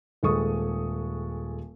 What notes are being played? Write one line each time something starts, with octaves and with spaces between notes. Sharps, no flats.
D#1 G#3 A4 C#6 D#6